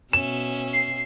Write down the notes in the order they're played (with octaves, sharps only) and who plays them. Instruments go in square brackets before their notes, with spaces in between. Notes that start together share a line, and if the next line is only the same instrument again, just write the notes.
[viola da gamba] B2 [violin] C#4 E5 [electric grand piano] E7
[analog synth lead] C7